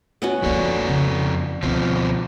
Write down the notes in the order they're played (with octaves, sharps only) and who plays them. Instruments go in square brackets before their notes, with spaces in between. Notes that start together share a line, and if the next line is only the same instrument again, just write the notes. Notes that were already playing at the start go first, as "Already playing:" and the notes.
[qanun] B3 C#4 F#4
[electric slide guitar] F2 A4 D5 [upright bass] F3 A#3
[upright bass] C#3
[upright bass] D2 [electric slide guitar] B2 F3 C4